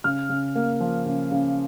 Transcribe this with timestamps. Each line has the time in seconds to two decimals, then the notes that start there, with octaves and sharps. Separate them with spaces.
0.04 C#3 F6
0.29 C#3
0.55 A#3
0.80 F3
1.06 C#3
1.32 C#3